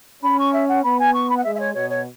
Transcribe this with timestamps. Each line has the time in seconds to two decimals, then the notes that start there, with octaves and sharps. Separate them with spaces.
0.23 C#4 B5
0.39 C#6
0.53 E5
0.68 F#5
0.83 B3 B5
0.99 G#5
1.14 C#6
1.30 B5
1.37 F#5
1.44 G#3 E5
1.55 E5
1.60 C#5
1.74 B2 C#5
1.90 C#5